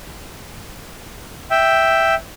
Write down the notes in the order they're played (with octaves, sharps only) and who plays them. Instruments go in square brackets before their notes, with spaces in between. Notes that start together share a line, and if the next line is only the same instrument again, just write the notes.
[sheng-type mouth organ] E5 G5